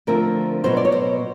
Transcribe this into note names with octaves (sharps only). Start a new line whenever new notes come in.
D3 F3 A3 C4 A#4
B2 F#3 B3 C5
D5
C#5
C5